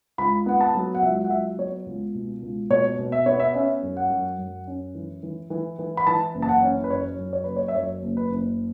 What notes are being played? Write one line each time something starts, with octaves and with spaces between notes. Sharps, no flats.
C#2 B5
B3 F#5
A5
F#3
F#5
C#2 E5
F#5
F#3 E5
B3 C#5
C#2
B2
C#2
B2 C#5
B2
E5
B3 C#5
E5
C#4 E5
F#2
F#5
F#2
F#2
C#4
E3
E3
E3
E3
B5
E3 A5
F#1
A5
F#5
C#4
B4
F#2 C#5
F#2
C#5
F#1 B4
C#5
E5
F#2 C#5
F#1
B4
F#1